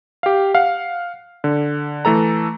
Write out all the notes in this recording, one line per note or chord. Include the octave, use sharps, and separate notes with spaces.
G4 F5
F5 F#5
D3
E3 A3 A4 A#5